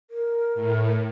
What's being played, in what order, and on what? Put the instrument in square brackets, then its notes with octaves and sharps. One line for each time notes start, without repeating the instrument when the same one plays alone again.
[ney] A#4
[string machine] A2